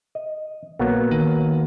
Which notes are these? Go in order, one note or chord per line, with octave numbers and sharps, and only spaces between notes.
D#5
A#1 F#3 A#3 B3
D#3